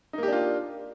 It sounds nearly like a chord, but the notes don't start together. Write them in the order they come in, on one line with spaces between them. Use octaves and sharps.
D#4 A#3 G4 D4 F4